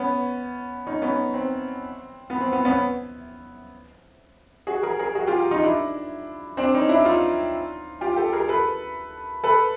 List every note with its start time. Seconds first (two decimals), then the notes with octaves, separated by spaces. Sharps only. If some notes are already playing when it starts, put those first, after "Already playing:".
Already playing: B3 C#4
0.87 C#4 D#4
1.02 B3 C#4
1.34 C4
2.30 B3
2.41 C4
2.53 B3
2.65 B3 C#4
4.67 F#4 G#4
4.83 G#4 A#4
4.99 G#4 A#4
5.15 F#4 G#4
5.27 F4 G4
5.51 D#4 F4
5.63 D4 E4
6.57 C4 D4
6.74 C#4 D#4
6.89 D4 E4
7.05 D#4 F4
8.01 F4 G4
8.16 G4 A4
8.33 G#4 A#4
8.48 A4 B4
9.44 A4 B4